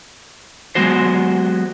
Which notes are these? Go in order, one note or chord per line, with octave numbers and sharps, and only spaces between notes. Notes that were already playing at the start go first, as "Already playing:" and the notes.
F#3 G#3 B3 F#4 C5